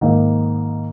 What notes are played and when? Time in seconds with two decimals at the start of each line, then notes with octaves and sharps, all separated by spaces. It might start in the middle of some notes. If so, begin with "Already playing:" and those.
0.01 G#2 D#3 A#3 D#4